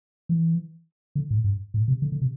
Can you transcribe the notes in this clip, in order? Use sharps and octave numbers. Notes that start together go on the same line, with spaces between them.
E3
D3
A2
G2
A2
C3
D3
D3
C3